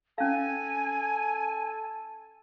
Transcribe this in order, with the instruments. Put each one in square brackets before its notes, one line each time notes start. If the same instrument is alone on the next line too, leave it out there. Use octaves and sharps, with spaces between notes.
[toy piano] C#4 F5 [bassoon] A4 [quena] G#5